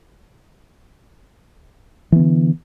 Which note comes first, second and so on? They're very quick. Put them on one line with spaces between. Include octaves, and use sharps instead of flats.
E3 B3 D3